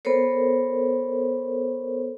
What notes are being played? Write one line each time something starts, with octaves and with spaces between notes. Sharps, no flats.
B3 A4 A#4 C5 C#5